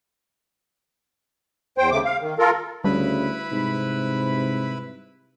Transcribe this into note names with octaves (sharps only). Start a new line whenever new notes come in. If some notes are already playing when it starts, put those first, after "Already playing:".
E2 C5 G5
D#2 C#3 A3 D6
F5
D#3
F4 A4 A#4
D2 C#3 G3 E4 B4 B5
G#2 C3